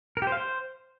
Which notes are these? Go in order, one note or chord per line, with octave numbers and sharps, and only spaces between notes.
A#4
G4
C5
F5
C5